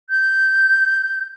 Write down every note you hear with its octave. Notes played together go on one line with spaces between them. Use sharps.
G6